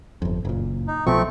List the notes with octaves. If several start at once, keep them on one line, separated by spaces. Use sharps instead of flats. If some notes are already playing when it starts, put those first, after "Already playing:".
G1 F2
F#1 A#2
D#4
B1 B2 F3 A3 C4 C#6